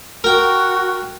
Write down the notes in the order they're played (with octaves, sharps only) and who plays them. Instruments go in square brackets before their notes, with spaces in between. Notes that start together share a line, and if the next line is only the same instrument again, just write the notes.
[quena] F#4 [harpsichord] A#4 G5